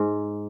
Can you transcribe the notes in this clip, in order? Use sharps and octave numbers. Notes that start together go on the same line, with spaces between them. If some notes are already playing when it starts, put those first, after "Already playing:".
Already playing: G#2